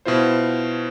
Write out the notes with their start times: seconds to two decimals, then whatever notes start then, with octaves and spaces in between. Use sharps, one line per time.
0.05 B2 E4 F4 C5